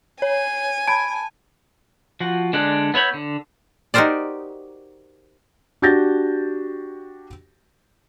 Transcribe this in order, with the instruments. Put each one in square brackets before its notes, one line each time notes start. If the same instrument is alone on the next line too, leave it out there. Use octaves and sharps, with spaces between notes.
[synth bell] C#5 [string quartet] G#5
[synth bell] A5 [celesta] B5 G#6 D7
[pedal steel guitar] F3 F#4
D3 G#3 D4 D5 F#6
B3 E4 C#5 B5 G6
D3
[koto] D#4 F#4 G4 A#4 C5 D5
[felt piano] D4 F#4 G4 G6 A6 A#6